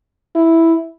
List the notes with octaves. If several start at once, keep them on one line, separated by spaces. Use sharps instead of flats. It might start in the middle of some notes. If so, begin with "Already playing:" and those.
E4